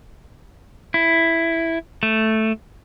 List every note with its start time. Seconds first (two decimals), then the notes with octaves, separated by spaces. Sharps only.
0.94 E4
2.03 A3